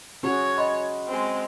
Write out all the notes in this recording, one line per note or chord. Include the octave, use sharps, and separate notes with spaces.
C#4 F#4 G#4 C#5
D#5 B5 C6
G#3 C4